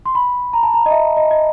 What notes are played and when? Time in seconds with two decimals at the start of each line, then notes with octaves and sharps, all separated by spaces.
0.06 C6
0.15 B5
0.53 A#5
0.63 A5
0.74 A#5
0.86 D#5
0.91 E5
1.17 D#5
1.31 D#5